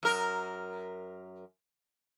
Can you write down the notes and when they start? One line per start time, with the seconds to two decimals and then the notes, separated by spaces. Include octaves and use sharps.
0.03 F#2 A#4